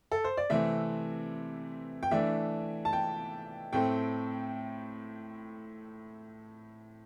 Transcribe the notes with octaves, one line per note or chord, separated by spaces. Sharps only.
A4
C5
D5
C3 E3 A3 C4 E5
G5
E3 A3 D4 E5
A5
G5
A2 A3 C4 G5